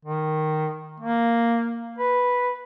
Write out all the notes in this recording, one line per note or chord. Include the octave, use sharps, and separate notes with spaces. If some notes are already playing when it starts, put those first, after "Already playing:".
D#3
A#3
B4